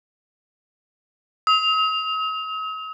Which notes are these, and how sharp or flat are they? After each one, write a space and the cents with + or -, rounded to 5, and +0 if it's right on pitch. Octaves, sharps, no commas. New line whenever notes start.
D#6 +45